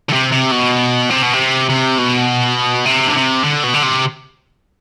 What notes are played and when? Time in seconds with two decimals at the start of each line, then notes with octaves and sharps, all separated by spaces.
0.09 D3
0.13 C3
0.32 C3
0.52 B2
1.10 C3
1.22 B2
1.33 C3
1.69 C3
1.98 B2
2.85 C3
3.07 D3
3.16 C3
3.44 D3
3.64 B2
3.74 D3
3.83 C3